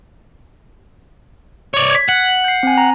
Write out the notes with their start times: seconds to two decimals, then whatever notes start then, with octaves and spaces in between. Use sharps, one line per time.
1.74 C#5 D5
1.91 G#6 B6
2.09 F#5 C#7
2.44 G6 C7
2.63 C4 G#5
2.78 A#5